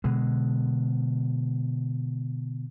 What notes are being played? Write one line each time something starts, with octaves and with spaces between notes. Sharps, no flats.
B2 D3 G#3